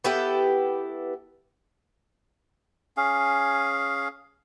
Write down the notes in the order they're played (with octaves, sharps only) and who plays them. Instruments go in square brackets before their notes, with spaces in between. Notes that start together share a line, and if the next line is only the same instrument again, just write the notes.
[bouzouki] B3 E4 G4 A4
[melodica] C#4 G#4 F5